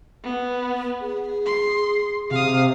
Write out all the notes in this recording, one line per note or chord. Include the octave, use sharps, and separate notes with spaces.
B3
G#4
C6
C3 F5 D#6